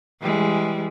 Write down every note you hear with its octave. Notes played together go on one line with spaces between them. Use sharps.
E3 G3 G#3